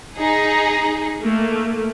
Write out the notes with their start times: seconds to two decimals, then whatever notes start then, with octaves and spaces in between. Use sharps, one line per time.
0.16 D#4 G#4
1.22 A3 A#3